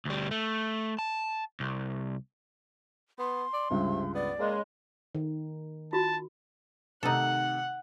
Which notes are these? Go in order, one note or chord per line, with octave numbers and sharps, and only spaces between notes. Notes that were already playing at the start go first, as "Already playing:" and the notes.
D2 G3
A3
A5
C2
B3 C6
D5
C#2 G2 C3
B3 D5
C#3 G#3 A#3
D#3
F4 F#4 A5
C3 D#3 A3 D#4 A4 F#5